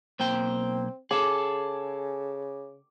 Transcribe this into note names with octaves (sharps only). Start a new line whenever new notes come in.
B1 A#3 C4 G5
C#3 G#4 A4 D6